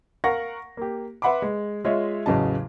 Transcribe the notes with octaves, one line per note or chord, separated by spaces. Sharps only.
A#4 F5 F#5 C#6 A#6
A#3 G4
B4 E5 F#5 B5 C6 D6
G#3
G#3 F4 C#5 D#5 E5
A1 E2 C#3 F#3 D#5 A5